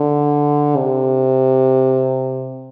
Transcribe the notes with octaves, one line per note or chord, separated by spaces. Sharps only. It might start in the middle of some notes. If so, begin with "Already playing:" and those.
Already playing: D3
C3